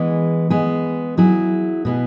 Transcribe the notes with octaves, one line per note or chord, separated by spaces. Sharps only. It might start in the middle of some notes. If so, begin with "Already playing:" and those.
Already playing: E3 G#3 B3 G#4
G#3 B3 G#4
F#3 E4 G#4
B2 B3 G#4